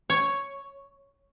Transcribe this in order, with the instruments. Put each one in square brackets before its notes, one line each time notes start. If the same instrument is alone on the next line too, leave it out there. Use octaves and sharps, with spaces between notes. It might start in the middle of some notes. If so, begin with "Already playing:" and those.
[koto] C#5